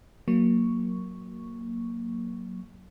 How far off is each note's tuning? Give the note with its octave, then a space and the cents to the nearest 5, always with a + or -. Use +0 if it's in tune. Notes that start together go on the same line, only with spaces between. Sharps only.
F#3 -5 A#3 +0 C#6 +0